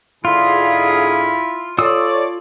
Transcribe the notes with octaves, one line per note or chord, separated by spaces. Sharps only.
G#2 D3 E4 F4 G#4
F4 A4 C#5 D5 D#6 E6